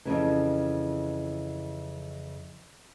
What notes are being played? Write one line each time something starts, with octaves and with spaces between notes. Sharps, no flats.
F2 G#2 C#3 E3